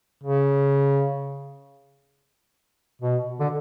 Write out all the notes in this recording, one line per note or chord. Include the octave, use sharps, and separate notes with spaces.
C#3
B2
D3